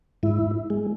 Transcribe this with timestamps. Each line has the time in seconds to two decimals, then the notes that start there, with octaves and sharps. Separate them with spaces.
0.23 G#2 E4
0.70 G#3